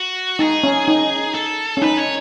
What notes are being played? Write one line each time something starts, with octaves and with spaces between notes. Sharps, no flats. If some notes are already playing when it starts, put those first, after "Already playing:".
Already playing: F#4
D#4 G#4
C#4
D#4
A4
C#4
D#4 B4
C#5